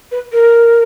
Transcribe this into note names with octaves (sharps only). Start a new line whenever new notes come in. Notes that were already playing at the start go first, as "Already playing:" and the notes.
B4
A#4